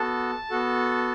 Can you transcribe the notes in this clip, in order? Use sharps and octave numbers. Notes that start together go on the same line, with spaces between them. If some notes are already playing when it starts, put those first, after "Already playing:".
Already playing: B3 F#4 A4 A5
B3 F#4 A4